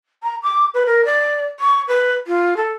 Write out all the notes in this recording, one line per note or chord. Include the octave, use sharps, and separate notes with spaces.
A#5
D6
B4
A#4
D5
C#6
B4
F4
A4